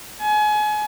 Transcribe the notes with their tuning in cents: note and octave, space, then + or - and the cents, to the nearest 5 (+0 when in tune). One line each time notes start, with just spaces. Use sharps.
G#5 +30